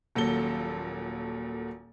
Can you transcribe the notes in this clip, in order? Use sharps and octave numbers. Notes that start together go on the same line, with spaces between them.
D#1 A#2 F#3 A4 A5 G7